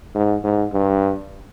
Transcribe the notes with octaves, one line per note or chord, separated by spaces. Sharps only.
G#2
G#2
G2